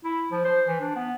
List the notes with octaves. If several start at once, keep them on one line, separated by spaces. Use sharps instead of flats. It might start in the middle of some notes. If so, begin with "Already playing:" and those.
E4
F3
C5
E3
D4
B3